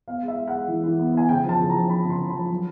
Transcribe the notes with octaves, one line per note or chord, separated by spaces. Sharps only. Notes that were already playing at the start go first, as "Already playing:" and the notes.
B3 F5
G#3
E5
G#3
F#5
G#3
E3
E3
B3
B3 G#5
C#3 G5
F3 A5
C#3
A#5
F3
F3 B5
C#3
C6
C#3
F3 B5
F#3